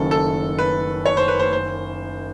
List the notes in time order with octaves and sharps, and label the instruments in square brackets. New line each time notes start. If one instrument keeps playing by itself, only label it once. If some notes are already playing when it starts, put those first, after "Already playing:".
Already playing: [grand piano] F#1 F#2 D#3 [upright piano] A4
[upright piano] A4
B4
C#5
C5
B4
C5
C5